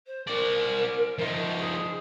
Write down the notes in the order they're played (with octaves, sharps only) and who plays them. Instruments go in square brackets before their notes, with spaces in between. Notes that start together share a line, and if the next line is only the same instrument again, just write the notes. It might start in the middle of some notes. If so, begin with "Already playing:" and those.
[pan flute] C5
[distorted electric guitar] C4 D5 [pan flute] A#4
[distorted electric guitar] F3 D#4 [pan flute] E5
[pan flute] G#4